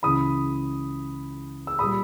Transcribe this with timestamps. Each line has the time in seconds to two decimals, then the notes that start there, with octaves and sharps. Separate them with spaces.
0.03 C#2 C#3 E3 B5 D#6
1.67 E6
1.79 A#2 G3 B5 D#6